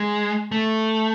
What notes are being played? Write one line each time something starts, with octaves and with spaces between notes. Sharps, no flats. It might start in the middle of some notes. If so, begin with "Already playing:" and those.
Already playing: G#3
A3